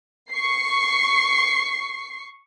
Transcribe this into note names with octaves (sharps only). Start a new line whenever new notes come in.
C#6 C7